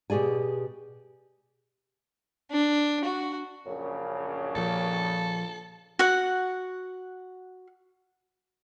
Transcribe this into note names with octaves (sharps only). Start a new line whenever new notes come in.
B2 G4 G#4 D5 G#5
D4
F#4
A#1 F#2 C#3
A#2 F3 A4
F#4 F#5